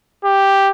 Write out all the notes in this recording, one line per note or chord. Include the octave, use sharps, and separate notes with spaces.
G4